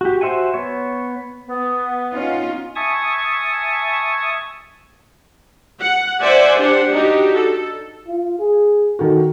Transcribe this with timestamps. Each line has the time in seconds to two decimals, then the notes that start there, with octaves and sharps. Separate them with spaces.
0.01 F#4 G4
0.21 F#4 C5 E5 F#5 G#5
0.54 B3 C#5
1.48 B3
2.13 C#4 D#4 F4
2.76 E5 G#5 A5 C#6 D#6
5.80 F#5
6.22 C5 D5 E5 F#5 G#5
6.58 D4 G4 C5 F#5
6.91 D4 D#4 F#4 G4
7.36 A4
8.07 F4
8.39 G#4
8.99 D#3 F#4 A4